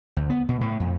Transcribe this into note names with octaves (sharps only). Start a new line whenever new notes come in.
D2
B3
B2
A2
F2